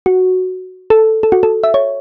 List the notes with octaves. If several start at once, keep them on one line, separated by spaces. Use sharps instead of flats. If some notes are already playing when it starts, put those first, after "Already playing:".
F#4
A4
A4
F#4
A4
E5
C#5